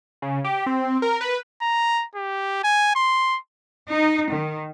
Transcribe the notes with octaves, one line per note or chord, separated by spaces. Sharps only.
C#3
G4
C4
A#4
B4
A#5
G4
G#5
C6
D#4
D#3